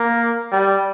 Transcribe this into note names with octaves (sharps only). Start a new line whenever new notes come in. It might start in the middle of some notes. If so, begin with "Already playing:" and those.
Already playing: A#3
G3